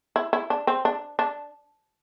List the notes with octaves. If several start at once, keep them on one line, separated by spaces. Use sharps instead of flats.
E4
E4
D4
C4
D4
D4